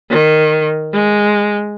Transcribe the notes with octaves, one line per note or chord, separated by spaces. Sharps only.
D#3
G#3